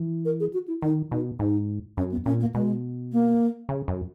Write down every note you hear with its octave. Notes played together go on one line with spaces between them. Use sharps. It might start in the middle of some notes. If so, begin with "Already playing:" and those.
Already playing: E3
A#4
G#4
F#4
E4
D#3 D#4
B2 D#4
G#2 D#4
F#2 C#4
B3
A#2 C#4
A#3
B2 G#3
A#3
C#3
F#2